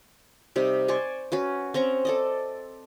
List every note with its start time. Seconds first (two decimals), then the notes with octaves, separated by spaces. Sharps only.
0.56 C3 G3 D#4
0.88 C5 D5 G#5 C#6
1.32 C#4 F#4 B4
1.74 C4 C#4 A#5 C#6
2.05 A4 D5 D#5